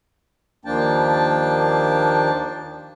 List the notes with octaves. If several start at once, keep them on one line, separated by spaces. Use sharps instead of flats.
D#2 F3 A#3 D4 G5 A5